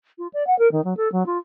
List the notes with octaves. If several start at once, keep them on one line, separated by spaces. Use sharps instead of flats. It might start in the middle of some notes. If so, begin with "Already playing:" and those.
F4
D5
F#5
A#4
D#3
F#3
A4
F#3
F4